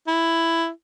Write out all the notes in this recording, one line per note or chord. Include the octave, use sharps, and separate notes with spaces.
E4